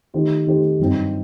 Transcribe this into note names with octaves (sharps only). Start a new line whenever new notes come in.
D#3 A3 D#4 G4 C5
D#3 A3 D#4 G4 C5
G1 G2 F#3 C4 D#4